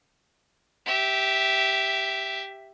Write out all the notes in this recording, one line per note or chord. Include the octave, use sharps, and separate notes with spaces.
G4 E5